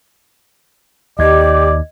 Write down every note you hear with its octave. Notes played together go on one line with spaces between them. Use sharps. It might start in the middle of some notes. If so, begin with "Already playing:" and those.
D#2 G4 D5 D#5 G#6